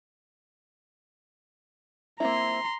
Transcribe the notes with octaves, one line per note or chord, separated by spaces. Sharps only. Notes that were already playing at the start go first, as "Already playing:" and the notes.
A#3 C4 E4 A#5 C6